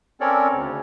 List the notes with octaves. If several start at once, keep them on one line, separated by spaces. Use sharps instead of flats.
C4 C#4 A4 A#4 C#5 D5
D2 C#3